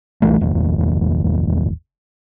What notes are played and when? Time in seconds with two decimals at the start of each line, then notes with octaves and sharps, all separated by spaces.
0.22 C2 E3 A3
0.41 D#1 G#1 E2